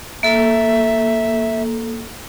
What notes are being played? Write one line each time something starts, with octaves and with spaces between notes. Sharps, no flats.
A#3 A4 E5